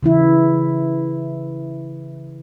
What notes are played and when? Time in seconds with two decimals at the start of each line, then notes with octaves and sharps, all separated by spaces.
0.03 C#3 E3 E4